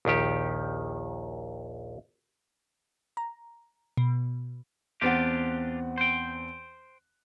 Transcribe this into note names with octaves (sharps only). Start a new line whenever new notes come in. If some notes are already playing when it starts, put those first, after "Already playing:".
A#1 D#2 D#3 G4
A#5
B2
E2 C4 D4 F4 G4 F#5
C5 G5